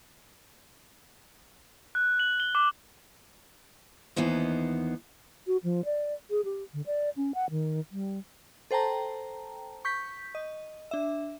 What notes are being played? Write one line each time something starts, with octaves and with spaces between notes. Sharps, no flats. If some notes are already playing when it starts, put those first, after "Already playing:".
F#6
F#7
G7
D6
D#2 E3 B3 D#4 C5
F#4
F3
D5
G#4
G4
D3
D5
C#4
F#5
D#3
G3
A4 C5 G5 A5 A#5
C#6 G6 B6
D#5
D4 E5